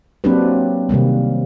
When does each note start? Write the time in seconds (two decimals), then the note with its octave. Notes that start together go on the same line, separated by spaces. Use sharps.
0.24 F#3 A#3 C4 D4 G4 B4
0.89 C3 D#3 G3 A#3